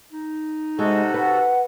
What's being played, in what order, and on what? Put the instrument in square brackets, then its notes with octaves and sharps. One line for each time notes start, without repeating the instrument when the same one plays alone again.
[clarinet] D#4
[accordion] C3 F#4 A4 [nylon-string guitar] G#3
[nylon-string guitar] B4 [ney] F#5